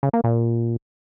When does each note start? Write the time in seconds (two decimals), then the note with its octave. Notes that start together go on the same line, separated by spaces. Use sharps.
0.03 C#3
0.13 A#3
0.24 A#2